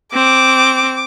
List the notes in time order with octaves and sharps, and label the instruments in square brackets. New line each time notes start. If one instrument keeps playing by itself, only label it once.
[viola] C4 [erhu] D6